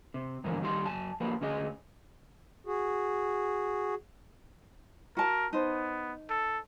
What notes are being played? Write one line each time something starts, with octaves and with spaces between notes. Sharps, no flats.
C3
G2 D3 E3 F3 B3 A#4
D#3 G3 D#4 G4 C6
F#2 G#5 A5
F3 A#3 G4 B4
D2 C#4 G#4 D#5
F#4 G#4
F#4 A#4 A5
B3 D#4 C5
A4